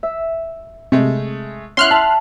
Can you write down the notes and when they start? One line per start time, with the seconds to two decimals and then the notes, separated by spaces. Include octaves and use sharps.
0.03 E5
0.92 C3 G#3 A3
1.77 C#4 E4 F#5 C6 F6 F#6
1.91 E5 A5